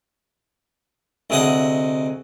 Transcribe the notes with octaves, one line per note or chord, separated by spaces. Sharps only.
D2 C3 G#4 D#5 F#5